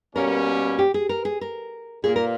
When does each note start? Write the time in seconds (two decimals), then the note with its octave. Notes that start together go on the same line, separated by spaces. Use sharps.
0.15 B2 G3 A#3 C#4 A#4
0.79 G4
0.94 G#4
1.09 A#4
1.25 G#4
1.41 A#4
2.04 A#2 A#3 G#4
2.16 A#4